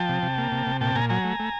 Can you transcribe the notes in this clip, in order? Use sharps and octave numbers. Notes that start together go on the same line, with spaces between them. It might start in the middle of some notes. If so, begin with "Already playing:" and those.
Already playing: F3 G5 A5
C3
C3
A#3
C3
C3
A#2 G5 A5
A#2 G#5 A#5
F#3 G#5 A#5
A3
A3